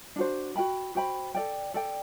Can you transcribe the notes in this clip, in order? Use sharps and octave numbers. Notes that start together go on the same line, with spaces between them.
D4 F#4 C5
F#4 C5 G5 B5
F#4 C5 G5 B5
A4 D5 G5
A4 D5 G5